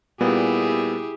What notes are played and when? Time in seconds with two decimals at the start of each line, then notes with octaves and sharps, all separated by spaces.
0.20 A#2 G3 B3 E4 G4 G#4